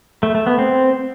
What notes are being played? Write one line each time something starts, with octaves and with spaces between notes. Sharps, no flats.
A3
A3
B3
C4